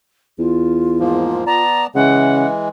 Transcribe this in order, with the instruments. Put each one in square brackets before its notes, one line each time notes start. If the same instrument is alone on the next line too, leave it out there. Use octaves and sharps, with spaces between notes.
[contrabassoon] E2 [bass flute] F4
[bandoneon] G#2 F3 A#3
[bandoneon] B3 D5 A5 [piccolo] A#5
[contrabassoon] C#3 [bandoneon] E3 G#3 [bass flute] E5 [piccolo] F#5